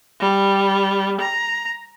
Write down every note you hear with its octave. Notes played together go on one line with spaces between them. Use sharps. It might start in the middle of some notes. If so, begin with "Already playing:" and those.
G3
A#5